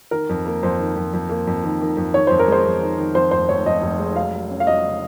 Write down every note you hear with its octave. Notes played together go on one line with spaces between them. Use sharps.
D#3 A#4
F2
A#3
F2 C5
D#3
F2
F2
A#3
F2
D#3
D#3
F2
D#3 C#5
F2 C5
A#4
G#3 C5
F2
D#3
D#3
F2 C5
F1 C5
F1 C#5
F2 D#5
F1
G#3
F#3 F5
F#3
C#4
F5
F#3 D#5
C#3